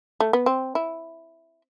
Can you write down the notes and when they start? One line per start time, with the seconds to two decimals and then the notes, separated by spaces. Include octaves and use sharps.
0.20 A3
0.33 B3
0.46 C4
0.75 E4